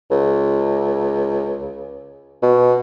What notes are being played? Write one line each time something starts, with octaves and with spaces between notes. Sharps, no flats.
C#2
B2